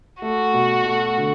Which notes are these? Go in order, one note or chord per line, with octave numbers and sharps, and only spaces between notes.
A3 F#4
B2
A3
D3